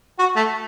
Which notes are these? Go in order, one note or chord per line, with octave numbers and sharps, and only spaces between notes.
F#4
A3